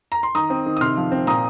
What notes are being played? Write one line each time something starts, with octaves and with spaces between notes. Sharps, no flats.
A#5
C6
D#3 A#5 D#6
C4
D#3
D#6
C3 C6 F6
F3
C4
A#2 A#5 D#6